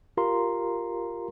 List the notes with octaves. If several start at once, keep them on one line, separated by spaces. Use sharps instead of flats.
F4 G4 A#4 F5 A#5 C6